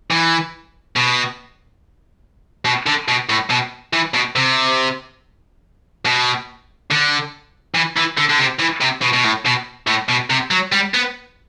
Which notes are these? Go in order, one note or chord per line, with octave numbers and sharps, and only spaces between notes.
E3
B2
B2
D3
B2
A2
B2
E3
B2
C3
B2
D3
E3
E3
D3
D3
C3
E3
C3
B2
B2
A2
B2
A2
B2
C3
F#3
G3
B3